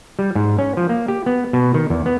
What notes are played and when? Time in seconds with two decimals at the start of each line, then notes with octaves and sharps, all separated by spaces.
0.19 G3
0.35 G#2
0.59 C#4
0.77 F3
0.89 A#3
1.08 G4
1.26 B3
1.53 B2
1.74 D#3
1.90 E2
2.06 B3